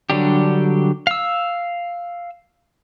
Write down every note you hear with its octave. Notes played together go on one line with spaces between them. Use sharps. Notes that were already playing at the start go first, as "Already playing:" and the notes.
D3 F#3 G3 D4 G4
F5 E6